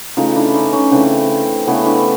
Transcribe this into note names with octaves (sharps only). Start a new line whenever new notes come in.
C#3 E3 A3 D#4 F4
D4 E4
C#4 D#4
C#4 D#4
C#3 E3 A3 C4 D4
C4
C#3 E3 A3 B3 C#4
D4 E4